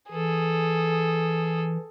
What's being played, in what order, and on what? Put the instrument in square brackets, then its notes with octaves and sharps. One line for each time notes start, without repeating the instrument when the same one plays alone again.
[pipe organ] E3 [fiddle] G#4 A4